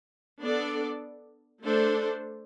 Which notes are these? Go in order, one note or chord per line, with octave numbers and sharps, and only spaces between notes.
B3 D4 A4 D5
A3 D4 A4 C5